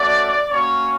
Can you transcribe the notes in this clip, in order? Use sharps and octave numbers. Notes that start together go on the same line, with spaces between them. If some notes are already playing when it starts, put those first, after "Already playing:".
Already playing: A3 C#4 F#4 D5
A#3 C#4 F#4 C#5